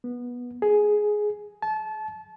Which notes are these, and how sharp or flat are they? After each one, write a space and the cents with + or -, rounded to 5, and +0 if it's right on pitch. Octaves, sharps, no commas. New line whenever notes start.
B3 -15
G#4 +10
A5 -25